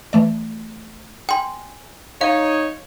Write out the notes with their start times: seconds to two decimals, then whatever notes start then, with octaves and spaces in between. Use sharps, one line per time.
0.13 E3 A3 D5
1.29 G5 G#5 C6
2.21 D#4 C#5 F5